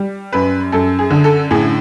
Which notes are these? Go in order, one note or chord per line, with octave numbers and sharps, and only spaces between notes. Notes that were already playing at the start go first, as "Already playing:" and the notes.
Already playing: G3
F#2 B4
F#2 A4
G#4
D3
A4
A2 G#4